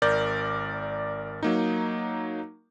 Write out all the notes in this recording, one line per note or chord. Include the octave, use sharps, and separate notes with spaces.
G#1 A#4 D5 G6
F#3 A#3 D#4